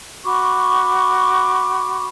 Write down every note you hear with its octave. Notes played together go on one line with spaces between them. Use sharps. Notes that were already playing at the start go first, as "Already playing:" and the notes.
F#4 B5 C#6 D6